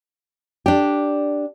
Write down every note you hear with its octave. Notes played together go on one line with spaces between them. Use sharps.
D4 G4